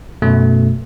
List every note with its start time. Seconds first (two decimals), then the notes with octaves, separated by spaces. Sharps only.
0.22 F#2 B2 A3